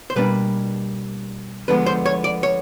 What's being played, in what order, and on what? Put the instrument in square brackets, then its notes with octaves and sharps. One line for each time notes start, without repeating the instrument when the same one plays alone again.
[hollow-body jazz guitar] C5
B2 G3 A#3 D4 B4
D2 D3 F3 G#3 B3 B4
C5
C#5
D5
C#5